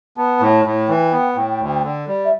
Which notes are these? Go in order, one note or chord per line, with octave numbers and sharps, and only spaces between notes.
B3 A5
A2
A2
E3 G5
B3
A2
D2
D3
G3
E5